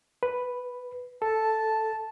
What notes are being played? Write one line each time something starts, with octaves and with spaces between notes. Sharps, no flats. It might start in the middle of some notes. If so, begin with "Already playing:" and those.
B4
A4 A5